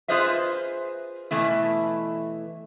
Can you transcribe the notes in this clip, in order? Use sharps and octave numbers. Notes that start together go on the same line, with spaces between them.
F4 G#4 B4 C5 D#5 E5
B2 E3 A3 E4